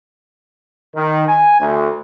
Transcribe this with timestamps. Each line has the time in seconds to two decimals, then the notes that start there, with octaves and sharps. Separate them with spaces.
0.95 D#3
1.29 G#5
1.60 D2